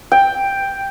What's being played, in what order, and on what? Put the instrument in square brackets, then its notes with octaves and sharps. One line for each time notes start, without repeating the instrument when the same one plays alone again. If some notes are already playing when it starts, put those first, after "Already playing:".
[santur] G5